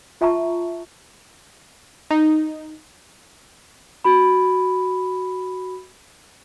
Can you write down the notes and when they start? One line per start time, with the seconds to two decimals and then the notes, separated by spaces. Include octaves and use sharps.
0.21 F4 E5 A5 A#5 C#6
2.10 D#4
4.04 F#4 B5